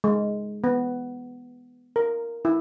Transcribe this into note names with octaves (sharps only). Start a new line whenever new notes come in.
G#3
B3
A#4
E4